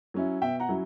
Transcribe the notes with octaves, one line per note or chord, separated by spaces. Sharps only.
F#3 C#4 E4
B2 E5 G5
F#5 A#5
F#3 C#4 E4